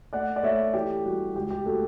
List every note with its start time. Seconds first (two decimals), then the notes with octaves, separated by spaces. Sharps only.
0.13 A3 D5 F#5
0.36 D5
0.43 A3 C#5 E5
0.74 E3 G4
1.05 G3 F#4
1.36 C#2 G4
1.51 G4
1.66 A3 F#4 A4